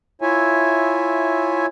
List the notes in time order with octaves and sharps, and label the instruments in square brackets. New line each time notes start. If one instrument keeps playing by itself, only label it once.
[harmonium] E4 F4 C#5 E5 G#5